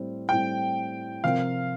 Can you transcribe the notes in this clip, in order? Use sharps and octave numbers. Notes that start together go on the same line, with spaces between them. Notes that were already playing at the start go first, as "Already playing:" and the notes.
Already playing: A2 G3 C4
A2 G3 C4 G5
C3 F3 C4 F4 A#4 F5